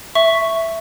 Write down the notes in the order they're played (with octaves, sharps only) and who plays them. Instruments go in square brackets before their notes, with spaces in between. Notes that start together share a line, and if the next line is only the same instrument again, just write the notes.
[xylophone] E5 C#6